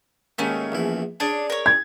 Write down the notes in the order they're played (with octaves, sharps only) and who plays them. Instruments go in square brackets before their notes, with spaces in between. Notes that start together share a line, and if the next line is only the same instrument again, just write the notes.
[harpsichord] D#2 G#2 D#3 [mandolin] A3 C#4
[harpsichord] A#1 E2 E4
[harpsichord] C#4 G#4 [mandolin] D4
[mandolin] A#4 C#5
[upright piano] G#6